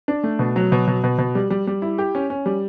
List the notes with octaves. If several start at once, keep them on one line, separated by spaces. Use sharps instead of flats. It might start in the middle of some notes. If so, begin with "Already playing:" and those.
D4
A3
B2
F#3
B2
B2
B2
B2
G3
G3
G3
E4
G4
C#4
C#4
G3